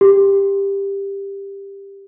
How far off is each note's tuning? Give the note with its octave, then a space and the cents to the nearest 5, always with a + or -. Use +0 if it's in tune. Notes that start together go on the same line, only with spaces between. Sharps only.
G4 +15